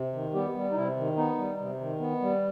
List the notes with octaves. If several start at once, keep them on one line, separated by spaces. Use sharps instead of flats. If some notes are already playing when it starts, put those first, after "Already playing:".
Already playing: C3
D#3
G3 B3 G4
G3
D#4
C3 E4
D#3
B3 D#4
G3
C3
D#3
B3
G3